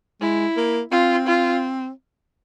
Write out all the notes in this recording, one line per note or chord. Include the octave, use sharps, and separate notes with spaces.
G#3 E4
A#3
C4 F4
F4